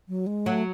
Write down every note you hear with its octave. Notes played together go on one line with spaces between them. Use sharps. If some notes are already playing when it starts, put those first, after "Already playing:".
F#3
G#3
F#3 A3